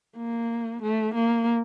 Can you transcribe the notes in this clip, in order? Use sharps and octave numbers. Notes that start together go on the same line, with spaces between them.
A#3
A3
A#3